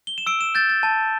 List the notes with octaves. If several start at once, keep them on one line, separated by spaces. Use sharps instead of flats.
G7
E7
E6 D7
E7
G6 A6
A6
A5